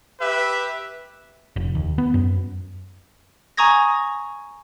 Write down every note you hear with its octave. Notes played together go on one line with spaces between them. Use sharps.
G4 B4 E5
F1
D#2
B3
F#2
G#5 A#5 C#6 D#6 G#6 A#6